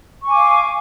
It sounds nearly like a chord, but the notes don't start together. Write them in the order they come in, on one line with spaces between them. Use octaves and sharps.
C#6 G#5 D6 F5